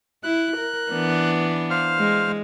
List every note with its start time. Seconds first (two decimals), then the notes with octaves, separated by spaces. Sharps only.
0.23 E4 F#6
0.57 A#4
0.91 E3 B3 D4
1.70 C5 F5 F6
1.99 G#3